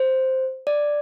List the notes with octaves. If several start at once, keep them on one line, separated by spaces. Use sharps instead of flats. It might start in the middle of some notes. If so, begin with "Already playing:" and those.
Already playing: C5
D5